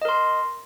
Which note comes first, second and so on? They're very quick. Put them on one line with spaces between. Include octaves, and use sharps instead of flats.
D#5 A#4 C6